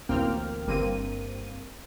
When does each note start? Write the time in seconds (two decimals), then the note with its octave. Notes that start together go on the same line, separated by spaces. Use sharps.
0.09 A1 D2 A#3 C4 G5 F6
0.67 G1 G2 A#3 C4 D#7